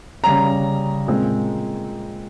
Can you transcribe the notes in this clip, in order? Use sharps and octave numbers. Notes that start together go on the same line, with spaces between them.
C#3 G3 C#4 A#5
A#2 G#3 C4